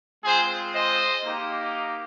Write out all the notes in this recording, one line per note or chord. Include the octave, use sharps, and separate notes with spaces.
G#3 C4 F4 G#4 C5
C5 D#5
A#3 D#4 G4